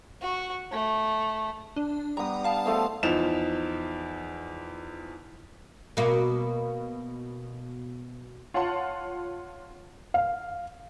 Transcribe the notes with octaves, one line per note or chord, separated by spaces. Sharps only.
F#4
A3
D4
G3 B3 A#5 D#6
F5 A5
F3 A3 B3
E2 F3 D#4 E7 F7
B2 A#3
F4 C#5 F#5 A5 C6
F5